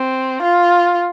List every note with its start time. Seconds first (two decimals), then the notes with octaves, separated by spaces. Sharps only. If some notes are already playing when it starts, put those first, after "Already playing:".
Already playing: C4
0.42 F4